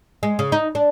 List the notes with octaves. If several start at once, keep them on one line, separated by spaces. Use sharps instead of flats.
G#3
C#3
D#4
D4